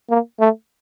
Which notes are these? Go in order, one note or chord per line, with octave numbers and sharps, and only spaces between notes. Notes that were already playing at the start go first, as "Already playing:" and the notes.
A#3
A3